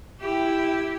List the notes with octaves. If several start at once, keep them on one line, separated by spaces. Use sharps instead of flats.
E4 G4